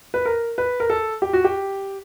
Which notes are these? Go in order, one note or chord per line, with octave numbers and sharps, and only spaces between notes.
B4
A#4
B4
A#4
A4
G4
F#4
G4